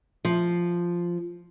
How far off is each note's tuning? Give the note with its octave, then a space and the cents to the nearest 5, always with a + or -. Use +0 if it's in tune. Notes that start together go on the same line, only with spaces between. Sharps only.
F3 -5